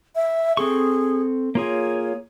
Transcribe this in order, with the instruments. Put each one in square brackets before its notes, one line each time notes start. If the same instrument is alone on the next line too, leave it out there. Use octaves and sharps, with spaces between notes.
[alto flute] E5
[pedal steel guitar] C4 A4 C#6 [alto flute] G#4
[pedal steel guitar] A#3 F4 G#4 [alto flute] C#5